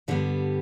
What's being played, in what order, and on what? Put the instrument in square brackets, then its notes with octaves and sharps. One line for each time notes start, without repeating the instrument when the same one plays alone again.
[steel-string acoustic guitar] G2 D3 G3 B3